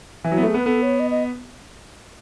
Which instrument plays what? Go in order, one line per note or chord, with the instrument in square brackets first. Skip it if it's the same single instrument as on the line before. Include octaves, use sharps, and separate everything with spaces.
[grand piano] E3
[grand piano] F#3 [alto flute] E4
[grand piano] B3
A3
[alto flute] G#4
[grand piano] B3
[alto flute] B4
[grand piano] B3 [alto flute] A4
[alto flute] C#5
D#5
D#5